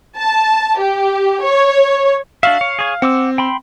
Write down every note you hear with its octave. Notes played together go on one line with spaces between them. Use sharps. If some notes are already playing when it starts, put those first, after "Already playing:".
A5
G4
C#5
D4 F#4 E5 F5
C#5
G#4 C#5
C4 F#5 D6 E6
G5 B5 C6